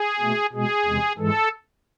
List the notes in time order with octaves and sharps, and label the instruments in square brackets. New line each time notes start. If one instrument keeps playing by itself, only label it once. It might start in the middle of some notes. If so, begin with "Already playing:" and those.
Already playing: [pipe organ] G#4
B2 A3
B2 G#3 G#4
E2 C3 G#3
G#2 E3 G#3 A4